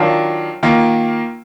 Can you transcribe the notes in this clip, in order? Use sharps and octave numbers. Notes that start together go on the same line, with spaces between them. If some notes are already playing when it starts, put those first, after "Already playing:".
Already playing: D#3 F#3 D4 F4
D#3 A#3 F4